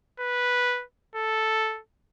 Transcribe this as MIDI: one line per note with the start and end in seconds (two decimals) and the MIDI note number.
0.20 0.84 71
1.16 1.80 69